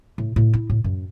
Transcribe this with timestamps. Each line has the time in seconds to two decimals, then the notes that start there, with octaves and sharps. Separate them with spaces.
0.18 A2
0.36 A2
0.53 E4
0.70 A2
0.84 F#2